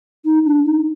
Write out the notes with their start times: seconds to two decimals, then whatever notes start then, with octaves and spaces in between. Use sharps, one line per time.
0.25 D#4
0.46 D4
0.65 D#4